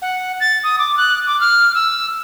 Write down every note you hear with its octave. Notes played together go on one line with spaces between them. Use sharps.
F#5
A6
D#6
D6
F#6
D6
F6
E6